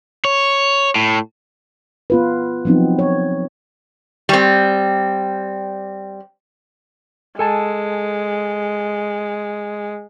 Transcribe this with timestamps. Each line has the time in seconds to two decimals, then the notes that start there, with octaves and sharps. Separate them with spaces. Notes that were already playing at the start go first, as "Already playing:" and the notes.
0.25 C#5
0.96 A2
2.10 B3 F4 B4
2.65 F3 F#3 B3 C4 D#4
2.99 C#5
4.29 G3 C4
7.39 G#3 A4 G#5 A5